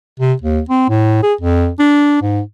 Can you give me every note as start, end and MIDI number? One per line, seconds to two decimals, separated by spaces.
0.19 0.33 48
0.42 0.60 39
0.69 0.86 60
0.89 1.20 45
1.22 1.34 68
1.41 1.69 41
1.79 2.18 62
2.21 2.41 44